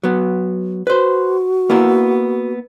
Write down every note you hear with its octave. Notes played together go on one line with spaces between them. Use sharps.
F#3 B3
F#4 B4 C5
A#3 B3 E4